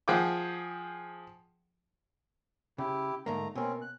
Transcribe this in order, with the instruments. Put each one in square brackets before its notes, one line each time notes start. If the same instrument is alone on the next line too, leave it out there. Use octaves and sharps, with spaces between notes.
[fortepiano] F3 G#4 F#5 G5 D6
[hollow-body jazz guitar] C#3 [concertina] E4 G4
[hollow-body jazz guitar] G#2 D3 A#3 [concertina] A3 A#5
[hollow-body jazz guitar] B2 A#3 [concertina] C4 C#4
[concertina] F#6